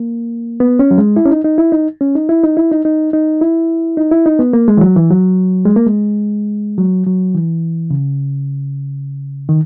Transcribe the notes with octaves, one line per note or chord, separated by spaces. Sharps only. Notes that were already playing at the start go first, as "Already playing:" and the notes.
Already playing: A#3
B3
C#4
F#3
G#3
E4
C#4
D#4
D#4
E4
D#4
C#4
D#4
E4
D#4
E4
D#4
D#4
D#4
E4
D#4
E4
D#4
B3
A#3
G#3
E3
F#3
E3
F#3
G#3
A#3
G#3
F#3
F#3
E3
C#3
D#3